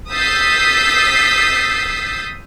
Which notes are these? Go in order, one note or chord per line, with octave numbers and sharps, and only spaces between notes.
D#6 E6 G6 A6 B6 C7